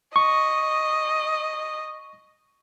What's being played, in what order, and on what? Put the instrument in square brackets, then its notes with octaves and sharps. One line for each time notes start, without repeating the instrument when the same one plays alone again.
[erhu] D#5 [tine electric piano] C#6